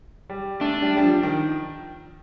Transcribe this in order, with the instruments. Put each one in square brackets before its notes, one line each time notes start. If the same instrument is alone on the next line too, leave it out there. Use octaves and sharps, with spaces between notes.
[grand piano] G3
[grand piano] A3 [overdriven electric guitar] D4
[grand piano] G3
G3
F3
D#3